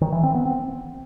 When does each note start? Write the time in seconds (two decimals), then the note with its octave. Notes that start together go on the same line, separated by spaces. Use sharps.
0.01 D#3
0.12 E3
0.23 C4
0.34 B3
0.46 C4